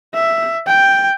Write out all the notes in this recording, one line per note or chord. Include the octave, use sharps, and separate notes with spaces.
E5
G5